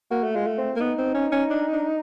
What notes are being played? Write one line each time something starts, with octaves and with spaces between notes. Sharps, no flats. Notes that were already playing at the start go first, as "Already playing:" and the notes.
A#3 F#4
A3
G#3 F4
A3
C4
A#3
B3 D#4
C4
C#4
C#4
D4
D4